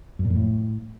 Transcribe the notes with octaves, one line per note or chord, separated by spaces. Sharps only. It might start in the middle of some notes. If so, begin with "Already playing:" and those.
F#2
A#2
F2
A2